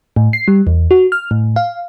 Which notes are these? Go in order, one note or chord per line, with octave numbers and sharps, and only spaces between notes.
A2
C7
G3
E2
F#4
F6
A2
F5